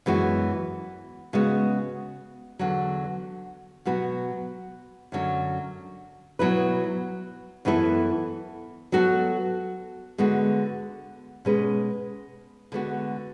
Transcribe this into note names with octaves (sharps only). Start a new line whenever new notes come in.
F#2 E3 G#3 B3 F#4
C#3 G#3 B3 F#4
E2 D3 F#3
B2 F#3 B3 F#4
F#2 D3 F#3 C#4
B2 F#3 B3 E4 B4
F#2 E3 B3 E4 A4
F#3 B3 F#4 A4
D3 G#3 B3 F#4
B2 G#3 C#4 G#4 B4
D3 G#3 B3 F#4